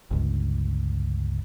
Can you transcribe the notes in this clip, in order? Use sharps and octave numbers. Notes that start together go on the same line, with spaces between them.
G1 C#2